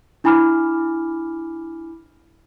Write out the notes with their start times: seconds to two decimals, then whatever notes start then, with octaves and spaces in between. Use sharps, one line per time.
0.24 D4 E4 G#5 B5 D6 F6